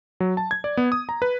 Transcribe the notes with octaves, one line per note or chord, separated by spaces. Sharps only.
F#3
A5
G#6
D5
B3
D#6
A#5
B4